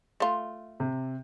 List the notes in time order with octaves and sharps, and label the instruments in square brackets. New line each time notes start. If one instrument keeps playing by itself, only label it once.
[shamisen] A3 F4
[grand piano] C3